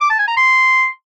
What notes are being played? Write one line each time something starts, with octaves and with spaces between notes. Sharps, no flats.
D6
A5
G#5
A#5
C6